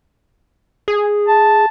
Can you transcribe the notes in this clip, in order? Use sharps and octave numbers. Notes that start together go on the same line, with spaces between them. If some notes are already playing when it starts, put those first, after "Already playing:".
G#4
A5